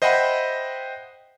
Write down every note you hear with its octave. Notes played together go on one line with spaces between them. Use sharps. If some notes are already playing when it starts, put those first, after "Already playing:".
C5 D#5 E5 F#5 G5 B5